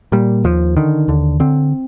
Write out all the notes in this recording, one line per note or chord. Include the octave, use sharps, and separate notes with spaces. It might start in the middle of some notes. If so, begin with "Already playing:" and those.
A#2 G3
D#2 F3
D3 D#3
D#2 D3
D3 C4